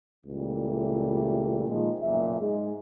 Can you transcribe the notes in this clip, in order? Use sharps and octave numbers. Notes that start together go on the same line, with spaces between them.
C#2 A#2 E3 G3 A3
A#2 D#3 F3 G#3
F#1 B1 A#2 E5
G#2 G#3